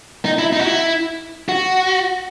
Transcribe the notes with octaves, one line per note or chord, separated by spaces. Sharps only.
D#4
E4
D#4
F#4
E4
F#4